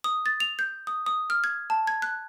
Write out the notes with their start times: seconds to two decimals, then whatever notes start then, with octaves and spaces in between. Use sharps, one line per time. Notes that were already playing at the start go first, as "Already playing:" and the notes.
0.04 D#6
0.26 A6
0.40 F7
0.59 G6
0.87 D#6
1.06 D#6
1.30 F6
1.44 G#6
1.70 A5
1.87 G#6
2.02 F#6